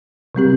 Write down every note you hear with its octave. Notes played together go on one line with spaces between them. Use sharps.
C3 G3 C4 G4